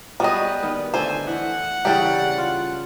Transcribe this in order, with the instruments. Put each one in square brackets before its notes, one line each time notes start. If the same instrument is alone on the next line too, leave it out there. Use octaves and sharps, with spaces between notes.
[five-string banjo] G3 D#5 [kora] B3 F#4 G#4 [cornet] B4
[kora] D#3 B3
[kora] D3 A3 [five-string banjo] C5 [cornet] G#5
[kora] E3 [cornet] F#5
[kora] C#3 E3 G3 [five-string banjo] D4 G4
[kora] F4